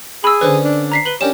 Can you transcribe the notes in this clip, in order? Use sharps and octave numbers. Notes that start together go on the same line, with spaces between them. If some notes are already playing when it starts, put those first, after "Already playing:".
G#4 B5 E6
D3 C#4 B4 C5
D4
A#5 B6 C7
B4 F#7 G7
C#4 D4 G4 A#4 E7